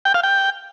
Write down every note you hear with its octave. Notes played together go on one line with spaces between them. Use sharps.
G5
F5
G5